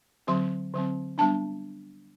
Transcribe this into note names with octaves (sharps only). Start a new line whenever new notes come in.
D3 F#3 C4 C6
D3 F#3 C4
G3 B3 D4 A5